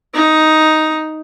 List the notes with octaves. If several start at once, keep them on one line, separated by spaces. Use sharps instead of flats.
D#4